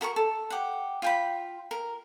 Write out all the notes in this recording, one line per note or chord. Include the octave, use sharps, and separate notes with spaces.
F#4 A#4 A5 C#6
A4
G4 F#5
F4 G5 B5
A#4